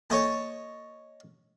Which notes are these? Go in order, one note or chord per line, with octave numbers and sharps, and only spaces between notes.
A#3 A4 C#5 D#5 A5